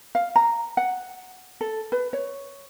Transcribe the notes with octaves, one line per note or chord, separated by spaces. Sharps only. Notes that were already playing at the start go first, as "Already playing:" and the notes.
F5
A#5
F#5
A4
B4
C#5